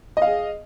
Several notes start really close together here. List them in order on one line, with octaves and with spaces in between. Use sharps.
D#5 F5 G#4